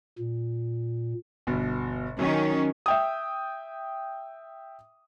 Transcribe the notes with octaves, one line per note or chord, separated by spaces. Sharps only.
A#2
G1 B2
D#3 F#3 C#4
E5 G5 D#6